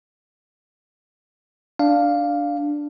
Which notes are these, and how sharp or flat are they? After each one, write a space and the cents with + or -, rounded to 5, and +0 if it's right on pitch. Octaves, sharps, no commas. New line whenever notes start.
D4 +0 F5 +0